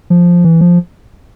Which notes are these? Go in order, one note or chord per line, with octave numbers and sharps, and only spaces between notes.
F3
E3
F3